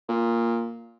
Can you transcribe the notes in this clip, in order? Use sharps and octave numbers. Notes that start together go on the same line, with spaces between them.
A#2